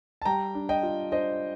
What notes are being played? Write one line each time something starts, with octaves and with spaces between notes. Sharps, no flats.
A5
G3 G5 A#5
D4
D#5 G5
F4
D4 C5 D#5